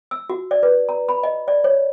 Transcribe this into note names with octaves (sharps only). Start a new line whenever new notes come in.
E6
F#4
D5
B4
A#5
B5
D#5
D5
C#5